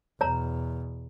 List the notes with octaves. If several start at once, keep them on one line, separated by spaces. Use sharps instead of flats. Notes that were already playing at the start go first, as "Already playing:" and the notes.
E2 B2 C#5 A#5